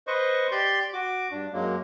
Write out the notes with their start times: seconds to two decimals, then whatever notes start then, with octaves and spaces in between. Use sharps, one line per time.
0.07 B4 C5 D#5 C#6
0.51 G4 D5 C6 G6
0.93 F#4 D6
1.32 G2 D4
1.53 F#2 F#3 G#3 A#3